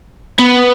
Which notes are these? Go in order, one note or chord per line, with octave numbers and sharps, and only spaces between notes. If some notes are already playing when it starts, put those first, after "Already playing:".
B3